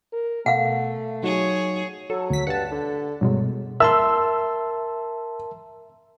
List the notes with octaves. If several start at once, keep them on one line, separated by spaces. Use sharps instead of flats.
A#4
B2 A3 F5 F#5
F#3 D#4 F#4 G#4 C#5
F#3 A4
D2 B6
G2 F#5 A5
D3
G2 B2 F#3 G#3
A#4 E5 A5 C6 E6